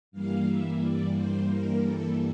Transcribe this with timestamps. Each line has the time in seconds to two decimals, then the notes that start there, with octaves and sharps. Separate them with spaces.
0.11 G2 E3 G3 A#3 F5
0.46 E5
0.80 D5
1.14 C5
1.48 A#4
1.82 A4